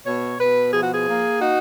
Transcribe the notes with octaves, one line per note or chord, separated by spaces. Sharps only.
B2 C#5
B2 B4
F3 G#4
F#4
G#4
A#3
D#4 F#4